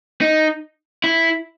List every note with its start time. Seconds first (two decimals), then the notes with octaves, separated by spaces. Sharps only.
0.21 D#4
1.04 E4